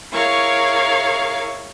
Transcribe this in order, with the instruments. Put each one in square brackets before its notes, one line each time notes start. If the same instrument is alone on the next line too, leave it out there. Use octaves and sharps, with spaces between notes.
[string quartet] E4 G#4 A#4 C#5 F5 C#6